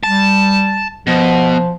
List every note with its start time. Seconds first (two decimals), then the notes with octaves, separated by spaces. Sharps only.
0.03 G3 A5
1.07 B2 F3